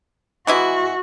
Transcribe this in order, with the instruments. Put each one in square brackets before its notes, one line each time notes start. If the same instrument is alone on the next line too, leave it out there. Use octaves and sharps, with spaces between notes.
[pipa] E3 G#3 E4 [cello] F#4